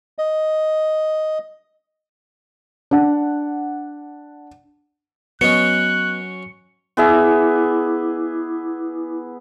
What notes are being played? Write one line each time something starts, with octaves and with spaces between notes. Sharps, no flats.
D#5
D4 F#5
F#3 B3 C#4 D#5 F#6 C#7
B3 E4 G#4 E5 D6